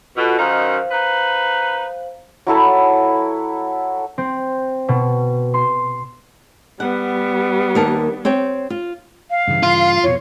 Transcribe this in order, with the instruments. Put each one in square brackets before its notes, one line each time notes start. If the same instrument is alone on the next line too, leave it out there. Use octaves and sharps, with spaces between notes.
[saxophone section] B2 [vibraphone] F4 A4
[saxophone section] F#2 D#3 D#4 [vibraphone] C5 F5
[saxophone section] D#4 B4
[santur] F#3 E4 A4 B5
[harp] C4
B2
C6
[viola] G3 B3 [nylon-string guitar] F#5
[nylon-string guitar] D#2 A#4 A5
C4 C#5 G5
F4
[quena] F5
[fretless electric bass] G2 C#3 E3
[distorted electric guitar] F4
[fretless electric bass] F2 B2 [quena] C#5